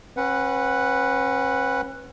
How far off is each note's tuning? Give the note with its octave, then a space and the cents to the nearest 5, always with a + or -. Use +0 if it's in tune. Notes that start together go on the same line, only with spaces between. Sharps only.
C#4 -40 B4 +0 F#5 +0